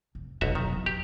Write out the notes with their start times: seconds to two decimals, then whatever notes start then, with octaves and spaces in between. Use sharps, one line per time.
0.15 F1
0.41 F1 B1 F2 F#4 E5
0.55 B2 D#3 F#3
0.73 E2
0.86 F#3 G4